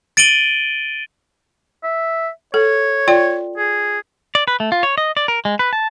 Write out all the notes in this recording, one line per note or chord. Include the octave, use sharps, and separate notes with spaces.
A6 D7 D#7 F#7 G7
E5
A4 C#5
F4 D5 G5
G#4
D5
B4
A3
F4
C#5
D#5
D5
A#4
G#3
B4
A5